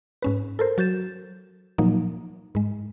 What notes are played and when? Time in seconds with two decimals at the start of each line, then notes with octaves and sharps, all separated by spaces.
0.22 G#2 C#4 B4
0.59 A4 A#4 C5
0.78 F#3 F#4 G6 A6 E7
1.78 A#2 F3 F#3 A#3 D#4
2.55 G#2 G#3